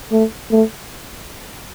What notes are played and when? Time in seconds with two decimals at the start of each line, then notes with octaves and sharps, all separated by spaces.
0.12 A3
0.51 A3